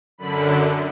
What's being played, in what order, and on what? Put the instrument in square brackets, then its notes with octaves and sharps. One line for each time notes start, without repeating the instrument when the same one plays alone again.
[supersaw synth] F#2 D3 B5